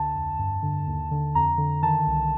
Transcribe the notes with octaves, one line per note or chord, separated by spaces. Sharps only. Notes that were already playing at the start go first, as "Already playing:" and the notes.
Already playing: D2 D3 A5
F2
G2
D3
D#2
D3
F2 A#5
D3
D#3 A5
C2